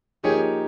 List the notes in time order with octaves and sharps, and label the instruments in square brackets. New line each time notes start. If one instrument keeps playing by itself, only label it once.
[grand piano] F3 A#3 D#4 G4 C#5 [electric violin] G#4